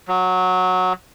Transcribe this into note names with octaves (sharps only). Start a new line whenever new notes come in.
F#3